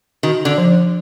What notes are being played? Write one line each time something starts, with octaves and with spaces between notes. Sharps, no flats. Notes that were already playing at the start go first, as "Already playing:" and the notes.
D#3 F#4
D3
F3